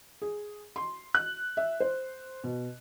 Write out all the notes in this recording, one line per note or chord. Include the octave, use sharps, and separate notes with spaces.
G#4
C6
F#6
E5
C5
B2